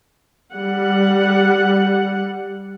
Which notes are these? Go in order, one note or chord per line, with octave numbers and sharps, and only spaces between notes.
G3 F#5